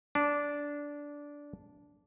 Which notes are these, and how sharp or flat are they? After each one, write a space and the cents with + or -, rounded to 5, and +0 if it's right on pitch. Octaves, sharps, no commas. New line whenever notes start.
D4 -15